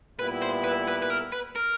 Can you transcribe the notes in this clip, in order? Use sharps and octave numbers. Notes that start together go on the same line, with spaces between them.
A#2 G3 B3 E4 B4
C5
B4
B4
B4
A#4
B4
A#4